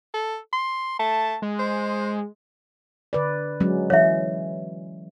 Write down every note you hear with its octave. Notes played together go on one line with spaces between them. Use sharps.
A4
C6
A3 A5
G#3
C5
D3 B4 D5
F#3 G#3 C#4
E3 F#3 C#5 E5